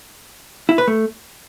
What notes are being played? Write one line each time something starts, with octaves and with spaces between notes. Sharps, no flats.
E4
B4
A3